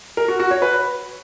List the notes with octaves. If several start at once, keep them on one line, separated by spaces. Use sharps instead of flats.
A#4
F#4
F#4
C#5
B4